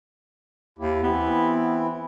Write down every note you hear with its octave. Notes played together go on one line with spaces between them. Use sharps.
D#2 E4 G4
E3 B3 C4 E4